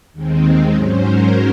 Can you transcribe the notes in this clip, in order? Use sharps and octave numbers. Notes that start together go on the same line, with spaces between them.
D#2 D#3 G#3 C4
G#2 F#3 C#4 C5
A#4